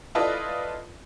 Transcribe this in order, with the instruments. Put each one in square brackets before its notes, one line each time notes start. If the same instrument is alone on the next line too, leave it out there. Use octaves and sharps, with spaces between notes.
[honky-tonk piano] E4 F4 A4 B4 D5 D#5